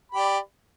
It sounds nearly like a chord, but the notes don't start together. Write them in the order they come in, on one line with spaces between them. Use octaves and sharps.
B5 G4 D5